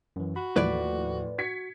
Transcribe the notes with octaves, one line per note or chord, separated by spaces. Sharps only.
F#2 E3
F#4 B5
D#2 A2 E3 F3 B4 D5
F#4 G#6 B6 C#7